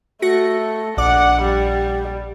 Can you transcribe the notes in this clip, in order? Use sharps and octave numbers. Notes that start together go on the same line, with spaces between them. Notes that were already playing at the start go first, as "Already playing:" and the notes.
A3 F#4 A#6 C#7
A#1 D5 F#5 D6
G3